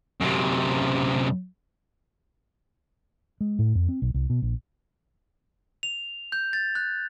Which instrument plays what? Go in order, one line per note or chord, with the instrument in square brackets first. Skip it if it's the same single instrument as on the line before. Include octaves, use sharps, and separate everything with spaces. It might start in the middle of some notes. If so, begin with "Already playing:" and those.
[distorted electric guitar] F#2 C3
[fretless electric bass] G#3
A2
F2
C4
B1
C2
B2
A#1
[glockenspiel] F7
G6
A6
F#6